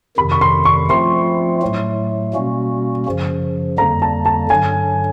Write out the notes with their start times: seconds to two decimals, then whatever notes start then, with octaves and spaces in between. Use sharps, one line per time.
0.17 F2 C3 D#3 B5
0.32 C#6
0.41 C6
0.65 C#6
0.90 F3 A3 C4 F4 C6
1.62 A2 F#3 A3
2.33 B2 G3 A#3 C#4 F#4
3.06 F#2 C#3 F3
3.78 F2 D3 G3 A#3 A#5
4.02 A5
4.26 A5
4.50 G2 D3 F#3 G#5